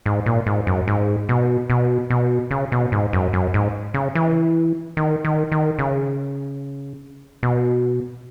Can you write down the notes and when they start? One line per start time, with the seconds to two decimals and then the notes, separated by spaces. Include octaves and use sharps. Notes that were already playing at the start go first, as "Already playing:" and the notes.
0.06 G#2
0.26 A#2
0.46 G#2
0.67 F#2
0.88 G#2
1.29 B2
1.70 B2
2.10 B2
2.51 C#3
2.72 B2
2.92 G#2
3.13 F#2
3.33 F#2
3.54 G#2
3.94 C#3
4.15 E3
4.97 D#3
5.25 D#3
5.52 D#3
5.79 C#3
7.43 B2